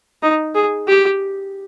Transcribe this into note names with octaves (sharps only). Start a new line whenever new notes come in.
D#4
G#4
G4